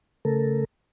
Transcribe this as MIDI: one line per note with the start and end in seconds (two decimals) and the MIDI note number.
0.25 0.64 49
0.25 0.64 57
0.25 0.64 69
0.25 0.64 70